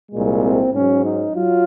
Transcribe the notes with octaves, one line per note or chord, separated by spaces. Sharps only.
C2 A#2 G#3
C4
G#2 F#3 C#4
D#4
F#3 F4